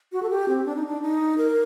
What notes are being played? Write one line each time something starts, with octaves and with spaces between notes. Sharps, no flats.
F#4
A4
G4
C4
D4
D#4
D4
D#4
A#4